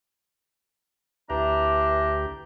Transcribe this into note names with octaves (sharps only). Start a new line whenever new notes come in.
D2 E3 D4 G4 A#5